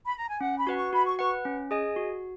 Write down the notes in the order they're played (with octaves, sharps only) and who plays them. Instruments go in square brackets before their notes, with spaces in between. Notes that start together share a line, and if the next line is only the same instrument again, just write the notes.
[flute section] B5
A#5
G#5
[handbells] C#4 [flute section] F#5
[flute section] B5
[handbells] F#4 B4 F#5
[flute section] C#6
[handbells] F#4 [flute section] B5
[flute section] C#6
[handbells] B4 F#5 [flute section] C#6
[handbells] C#4
G#4 D#5 G#5
F#4